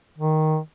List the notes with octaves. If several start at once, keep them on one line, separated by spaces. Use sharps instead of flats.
D#3